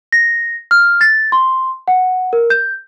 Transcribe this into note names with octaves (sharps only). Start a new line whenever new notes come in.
A#6
F6
A6
C6
F#5
A#4
G6